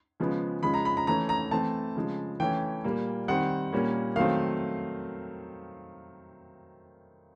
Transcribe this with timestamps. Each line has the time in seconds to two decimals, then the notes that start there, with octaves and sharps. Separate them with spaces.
0.20 C#3 F3 G#3 B3
0.63 C#3 F3 G#3 B5
0.74 A#5
0.85 B5
0.97 A#5
1.07 E3 A3 C#4 A#5
1.29 A#5
1.51 E3 A3 C4 A5
1.96 C#3 F3 G#3
2.40 E3 A3 C#4 G5
2.84 A#2 G3 A#3
3.28 D#3 G3 C4 F#5
3.72 A#2 G3 A#3 C#4
4.16 D#3 F#3 A3 C4 F5